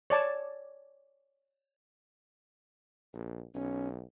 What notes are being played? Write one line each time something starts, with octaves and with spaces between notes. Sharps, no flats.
C#5 D5 A5
A#1
B1 C#4